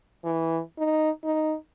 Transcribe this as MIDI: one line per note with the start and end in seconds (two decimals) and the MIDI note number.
0.25 0.60 52
0.79 1.10 63
1.24 1.55 63